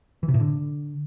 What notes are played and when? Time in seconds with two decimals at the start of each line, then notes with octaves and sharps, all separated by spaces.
0.23 E3
0.28 C3
0.34 A2
0.40 D3